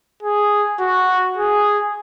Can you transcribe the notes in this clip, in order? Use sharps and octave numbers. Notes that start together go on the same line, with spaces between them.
G#4
F#4
G#4